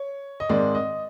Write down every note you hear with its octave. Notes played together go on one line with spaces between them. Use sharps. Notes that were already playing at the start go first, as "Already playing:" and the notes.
Already playing: C#5
D#5
G#2 D#3 G#3 C4 D5
D#5